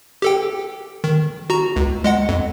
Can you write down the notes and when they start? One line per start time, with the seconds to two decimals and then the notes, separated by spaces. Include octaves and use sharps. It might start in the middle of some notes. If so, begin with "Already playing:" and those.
0.22 G4 A4 G5
1.04 D#3
1.50 F#4 A#5
1.76 C#2
2.04 G#3 D#5 F#5
2.29 F2